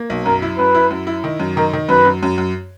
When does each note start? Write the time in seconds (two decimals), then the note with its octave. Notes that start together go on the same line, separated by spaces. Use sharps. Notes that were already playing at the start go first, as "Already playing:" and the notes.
Already playing: A#3
0.10 B1
0.26 F#2 A#4
0.42 E4
0.58 F#2 B4
0.75 E4
0.91 F#2
1.07 E4
1.24 D#3
1.40 F#2
1.56 D#3 A#4
1.73 D#3
1.89 F#2 B4
2.05 F#2
2.23 F#2
2.38 F#2